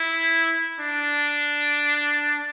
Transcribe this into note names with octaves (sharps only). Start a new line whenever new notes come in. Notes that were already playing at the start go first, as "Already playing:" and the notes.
Already playing: E4
D4